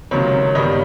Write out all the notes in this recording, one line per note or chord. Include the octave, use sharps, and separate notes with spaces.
C#2 C3 D#3 F#3 C#5
G2 D#3 G3 B3 C#5 D#5